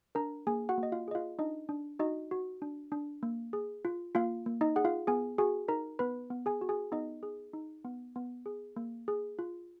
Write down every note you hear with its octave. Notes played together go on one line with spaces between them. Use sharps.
D4 A#4 A#5
A#3 G#4 G#5
F#4 F#5
A#3
D#5
F4 F5
G#4 D#5
F4 F5
D4 D#4 D#5
D4
D#4 F#4 D#5
F#4
D4
D4
A#3
G#4
F4
A#3 F4 F5
A#3
D#4 D#5
G#4 F#5
F4 F5
B3 G#4 G#5
F#4 G#4 G#5
D#4 A#4 A#5
B3 B4 B5
B3
G#4 G#5
F#4
G#4 G#5
B3 D#4 D#5
G#4
D#4
B3
B3
G#4
A#3
G#4
F4